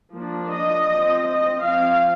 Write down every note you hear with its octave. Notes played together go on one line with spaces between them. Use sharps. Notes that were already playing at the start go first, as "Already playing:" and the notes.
F3 A#3 D4
D#5
F3 C4
D#5
F3 C4 F5